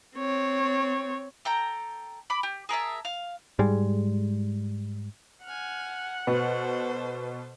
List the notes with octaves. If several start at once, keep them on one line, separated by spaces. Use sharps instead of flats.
C4 C#5
A4 G5 A#5
B5 D6
G4
G#4 A#4 E5 A5
F5
G#2 G3 G#3
F#5 G#5 F6
B2 A4 B4 C5